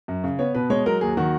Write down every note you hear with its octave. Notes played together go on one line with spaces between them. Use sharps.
F#2
C#3
B3 C#5
B2 B4
G#3 C#5
F#3 A#4
D#2 G#4
D#3 F#4